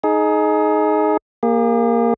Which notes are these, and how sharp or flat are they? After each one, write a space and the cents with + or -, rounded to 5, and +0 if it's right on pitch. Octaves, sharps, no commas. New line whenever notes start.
D#4 +0 G#4 +25
A#3 +0 G#4 -45